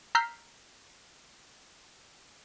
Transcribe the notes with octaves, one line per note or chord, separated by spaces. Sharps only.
A#5 E6 F6 G6 B6 C7